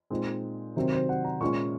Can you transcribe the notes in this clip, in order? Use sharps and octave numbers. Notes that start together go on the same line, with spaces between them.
A#2 G#3 C4 D#4
C3 D#3 F#3 C4 C5
C5
F#5
A#5
A#2 G#3 C#4 C#6